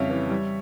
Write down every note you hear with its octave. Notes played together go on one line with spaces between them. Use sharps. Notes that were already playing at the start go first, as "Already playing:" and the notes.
Already playing: F2 C#3 G3 C#5 E5 F5
E3
G3